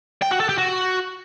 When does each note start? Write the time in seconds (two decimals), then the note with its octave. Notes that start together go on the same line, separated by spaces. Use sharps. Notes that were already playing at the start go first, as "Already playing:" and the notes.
0.22 G5
0.31 F#4
0.40 A4
0.49 G4
0.58 F#4